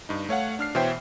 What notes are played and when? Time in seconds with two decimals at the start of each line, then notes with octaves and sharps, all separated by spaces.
0.09 G2 D#4
0.29 A3 C#5 F5 F#5
0.59 D4 F6 C7
0.75 B2 E3 C5 C#5 E5 G5